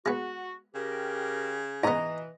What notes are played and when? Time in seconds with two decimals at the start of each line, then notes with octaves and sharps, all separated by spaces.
0.06 G#3 B3 F#4
0.75 C#3 G4 A#4
1.83 G#2 E3 B3 D#5 A#5